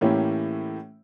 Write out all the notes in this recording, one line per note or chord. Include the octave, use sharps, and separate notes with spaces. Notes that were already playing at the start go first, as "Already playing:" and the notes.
A2 E3 A#3 C#4 E4 G4